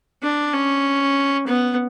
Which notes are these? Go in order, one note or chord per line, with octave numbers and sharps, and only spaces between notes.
D4
C#4
B3